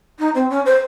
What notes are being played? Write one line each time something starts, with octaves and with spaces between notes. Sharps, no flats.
D#4
C4
C#4
C5